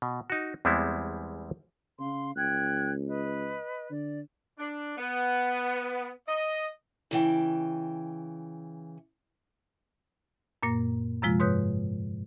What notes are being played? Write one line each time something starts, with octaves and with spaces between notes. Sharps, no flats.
B2
D#4 F#4
E2 G3 G#3 B3 C4 E4
C#3 F5 C6
C#2 G5 F#6 G#6
B4 D#5
D3 D5
D4
B3
D#5
C#3 E3 G5
F#2 A#2 A#3 A#6
F#2 C3 F3 G#3 F4
G#2 B4 C#5 D#6 F#6 G6